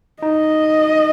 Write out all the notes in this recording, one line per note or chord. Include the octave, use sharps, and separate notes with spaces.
D#4 D#5